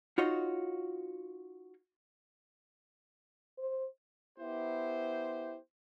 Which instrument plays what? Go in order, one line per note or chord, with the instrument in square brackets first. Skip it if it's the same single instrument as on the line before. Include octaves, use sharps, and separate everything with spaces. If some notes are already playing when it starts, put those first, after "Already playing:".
[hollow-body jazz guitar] D#4 F4 F#4 C#5 D#5
[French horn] C5
[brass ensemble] B3 E4 G4 C5